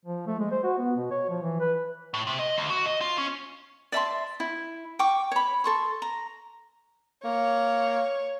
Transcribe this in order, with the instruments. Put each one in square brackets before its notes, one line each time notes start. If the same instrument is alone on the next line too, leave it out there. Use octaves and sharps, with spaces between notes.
[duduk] F3
A3
G#3
C5
F#4
B3
B2
C#5
F3
E3
B4
[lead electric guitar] A2
C3
D#5
D2
F#4
D#5
F4
C#4
[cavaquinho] D5 E5 A5 C6
E4
G5 C#6 D6
C#5 B5
A4 C6 C#6
A#5
[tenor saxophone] A#3 [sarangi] C#5